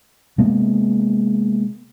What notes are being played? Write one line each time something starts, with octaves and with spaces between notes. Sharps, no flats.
C3 G#3 A#3 B3